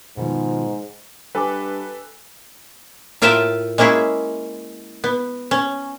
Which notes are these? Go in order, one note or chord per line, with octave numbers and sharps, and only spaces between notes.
G#2 B2 D#3 F3
G2 A4 B4 G5 G#5 D6
A2 F4 A#4 E5 G5 A5
G#3 A#3 C#4 E4 G#4
B3
C#4